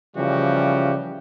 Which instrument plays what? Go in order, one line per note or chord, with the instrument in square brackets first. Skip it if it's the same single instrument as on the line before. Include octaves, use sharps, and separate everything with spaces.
[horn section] C#3 E3 F3 G3 F#4 G4